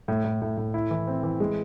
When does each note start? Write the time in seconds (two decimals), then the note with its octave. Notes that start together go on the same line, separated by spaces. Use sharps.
0.08 A2
0.25 A2
0.42 A2
0.57 A2
0.74 E4
0.91 E3
1.07 C4
1.23 E3
1.40 G#3